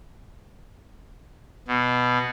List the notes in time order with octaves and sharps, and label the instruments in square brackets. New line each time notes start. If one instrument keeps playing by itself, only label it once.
[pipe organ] B2